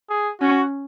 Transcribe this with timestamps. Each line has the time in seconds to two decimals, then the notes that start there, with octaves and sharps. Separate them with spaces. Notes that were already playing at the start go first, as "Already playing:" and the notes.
0.10 G#4
0.41 C#4 F#4